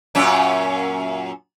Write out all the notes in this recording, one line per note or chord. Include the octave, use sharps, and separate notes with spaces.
F#2 A#2 C#4